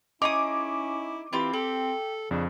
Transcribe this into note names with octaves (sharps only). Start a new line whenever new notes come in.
C#4 D#4 E4 G#4 D6 D#6
E3 C4 F4 G4 B5
G4 A4
F2 C#3 D4